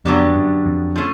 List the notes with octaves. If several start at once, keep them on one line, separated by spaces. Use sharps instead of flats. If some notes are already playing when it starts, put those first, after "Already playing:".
F2 D3 F#3 B3 D4 G4
F#2
F2
F3 A3 C#4